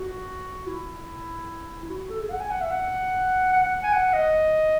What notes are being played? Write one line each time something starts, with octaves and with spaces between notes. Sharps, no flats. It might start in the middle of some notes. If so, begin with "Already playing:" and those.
Already playing: F#4
E4
E4
F#4
F#4
A4
G#4
F#5
G#5
F#5
E5
F#5
F#5
F#5
G#5
F#5
D#5